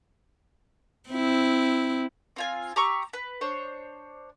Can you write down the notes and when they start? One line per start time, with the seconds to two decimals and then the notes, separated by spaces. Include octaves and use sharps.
1.09 C4 E4
2.36 C4 F4 G#5
2.76 G4 A#5 C#6 E6
3.13 B4
3.41 D4 C5 C#5